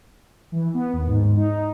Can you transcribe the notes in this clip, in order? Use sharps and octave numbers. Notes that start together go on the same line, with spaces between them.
E3
B3
D#2
G#2
D#4